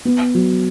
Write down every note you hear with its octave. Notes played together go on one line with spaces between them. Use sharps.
B3
F#3